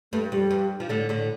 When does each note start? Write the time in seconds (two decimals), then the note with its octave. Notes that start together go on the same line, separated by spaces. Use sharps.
0.12 G2 A3
0.32 F2 G3
0.51 G2
0.80 F3
0.89 A2 D3
1.09 A2 D3